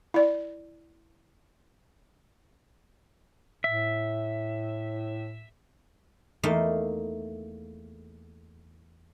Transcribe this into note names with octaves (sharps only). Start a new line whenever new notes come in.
E4 D5
A2 E5
E2 A3 A#3 D#4 F5